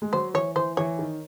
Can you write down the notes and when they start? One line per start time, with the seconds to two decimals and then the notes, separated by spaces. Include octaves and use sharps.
0.02 G#3
0.13 F#3 C5
0.34 E3 C#5
0.56 E3 C5
0.77 E3 C#5
0.99 D#3